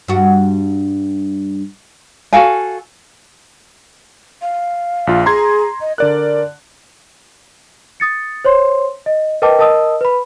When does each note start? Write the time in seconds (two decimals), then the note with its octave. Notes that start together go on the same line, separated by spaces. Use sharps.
0.08 G2 F#4
2.33 F#4 A4 F5 G#5
4.42 F5
5.07 A#1 F4
5.26 G#4 A#5 C6 G#6
5.81 D#5
5.98 D3 A#4 D5 F#6
8.00 D#6 A6 C#7
8.45 C5 C#5 C6
9.06 D#5
9.42 A#4 B4 D#5 G5 A5 D6
9.59 A#4 D#5 A5 D#6 E6
10.01 B4 B5